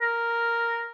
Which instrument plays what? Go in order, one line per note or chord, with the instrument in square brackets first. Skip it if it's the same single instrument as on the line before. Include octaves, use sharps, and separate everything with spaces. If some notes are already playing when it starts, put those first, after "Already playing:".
[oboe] A#4